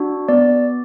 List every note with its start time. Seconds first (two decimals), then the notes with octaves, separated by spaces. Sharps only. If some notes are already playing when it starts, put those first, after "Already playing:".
Already playing: D4 F#4
0.28 B3 D5